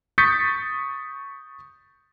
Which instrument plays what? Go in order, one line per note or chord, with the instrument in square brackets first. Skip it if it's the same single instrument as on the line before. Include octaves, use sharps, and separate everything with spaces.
[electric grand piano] C#6 D#6 G6 A6 B6 C#7